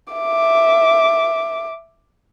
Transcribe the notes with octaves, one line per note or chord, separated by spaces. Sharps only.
E5 D6